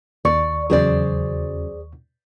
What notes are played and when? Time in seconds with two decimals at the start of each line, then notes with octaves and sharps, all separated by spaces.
0.25 D#2 D5 C#6
0.70 E2 C#3 F#3 G#4 C5 D5